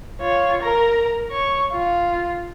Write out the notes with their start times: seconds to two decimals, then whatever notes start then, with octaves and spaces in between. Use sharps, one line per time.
0.21 F4 C#5
0.63 A#4 A#5
1.31 C#5 C#6
1.72 F4